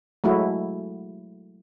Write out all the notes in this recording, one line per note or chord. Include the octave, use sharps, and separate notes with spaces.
F#3 G#3 A3 E4 F#4